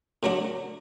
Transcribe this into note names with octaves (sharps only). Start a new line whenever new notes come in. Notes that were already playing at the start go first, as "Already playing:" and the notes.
A2 F#3 A3 D4 F#4